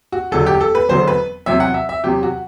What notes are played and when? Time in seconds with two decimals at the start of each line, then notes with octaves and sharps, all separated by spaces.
0.12 F#4
0.31 E1 E2 D3 F#3 A4
0.46 G4
0.61 A4
0.75 B4
0.89 E1 E2 D3 F#3 C5
1.08 B4
1.46 E2 C3 F#3 E5
1.60 F#5
1.74 E5
1.89 E5
2.03 E2 C3 F#3 G4
2.23 F#4